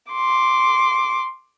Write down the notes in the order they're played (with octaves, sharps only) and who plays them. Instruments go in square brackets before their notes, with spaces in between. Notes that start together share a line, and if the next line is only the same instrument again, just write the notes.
[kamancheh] C6 D6